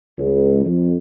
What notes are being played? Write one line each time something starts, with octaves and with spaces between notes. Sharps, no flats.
C#2
F2